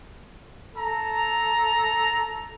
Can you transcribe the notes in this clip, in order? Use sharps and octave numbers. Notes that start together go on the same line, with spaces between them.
A4 A#5